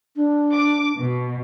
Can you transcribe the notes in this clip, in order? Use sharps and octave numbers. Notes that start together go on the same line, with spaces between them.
D4
D6
B2